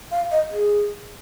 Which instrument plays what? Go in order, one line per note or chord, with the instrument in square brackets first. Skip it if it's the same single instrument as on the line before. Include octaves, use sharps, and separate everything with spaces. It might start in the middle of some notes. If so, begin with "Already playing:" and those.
[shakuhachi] F5
D#5
G#4